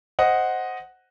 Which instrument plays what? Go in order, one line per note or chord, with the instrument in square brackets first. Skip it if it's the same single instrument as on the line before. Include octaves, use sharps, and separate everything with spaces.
[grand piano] C5 D#5 F#5